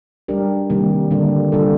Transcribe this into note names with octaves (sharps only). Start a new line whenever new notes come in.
G3 D4 G4 A#4
C3 D#3 G3 A#3
D3 G3 A#3 D4
C3 G3 D4 F4 A4